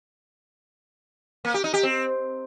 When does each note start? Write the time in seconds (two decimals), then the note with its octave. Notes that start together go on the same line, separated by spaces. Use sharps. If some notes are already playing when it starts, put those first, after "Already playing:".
1.45 A#3
1.54 G4
1.64 D#4
1.74 G4
1.83 C4